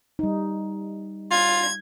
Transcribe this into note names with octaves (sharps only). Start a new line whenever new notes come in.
G3 D#4
F4 G#6